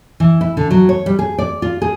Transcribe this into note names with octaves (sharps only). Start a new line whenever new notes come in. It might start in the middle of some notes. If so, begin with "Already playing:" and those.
E3
E4
D3
F#3
C#5
G3
G#4
D5
F4
G#4